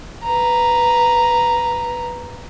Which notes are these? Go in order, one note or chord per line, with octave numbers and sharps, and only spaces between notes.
B4 A#5